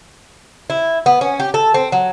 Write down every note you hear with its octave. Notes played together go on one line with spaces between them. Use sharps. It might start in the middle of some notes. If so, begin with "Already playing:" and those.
E4
B3
C#4
G4
A4
C4
F#3